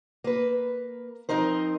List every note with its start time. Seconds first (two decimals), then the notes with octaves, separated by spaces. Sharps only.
0.24 A#3 B4
1.29 F3 C4 D#4 A#4 C5